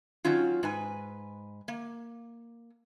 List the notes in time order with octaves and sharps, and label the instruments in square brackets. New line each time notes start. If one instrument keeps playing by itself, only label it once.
[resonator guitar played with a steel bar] D#3 F#3 C#4 F4
G#2 B4 G#5
A#3